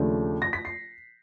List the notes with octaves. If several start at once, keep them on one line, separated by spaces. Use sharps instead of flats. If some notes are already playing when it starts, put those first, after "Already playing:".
Already playing: D#2 C#3 F3 A3 D4
A#6
B6
C7